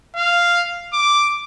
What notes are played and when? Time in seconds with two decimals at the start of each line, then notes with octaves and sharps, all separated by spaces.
0.16 F5
0.93 D6